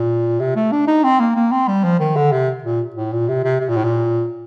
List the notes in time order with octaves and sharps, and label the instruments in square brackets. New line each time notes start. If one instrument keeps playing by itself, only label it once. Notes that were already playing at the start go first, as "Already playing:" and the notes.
Already playing: [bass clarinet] A#2
C3
A3
D4
D#4
C4
A#3
A#3
C4
G3
F3
D#3
D3
C3
A#2
A2
A#2
C3
C3
C3
A#2
A2
A#2